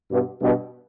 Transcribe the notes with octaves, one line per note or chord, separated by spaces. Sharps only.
G2 B2
G2 B2